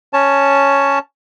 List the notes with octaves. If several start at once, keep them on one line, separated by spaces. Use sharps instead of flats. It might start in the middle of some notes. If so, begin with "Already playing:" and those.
C#4 C#5 A5